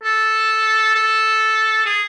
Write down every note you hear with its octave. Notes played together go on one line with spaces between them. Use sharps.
A4
A4
G#4